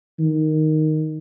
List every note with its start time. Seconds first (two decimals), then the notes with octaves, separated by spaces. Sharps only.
0.19 D#3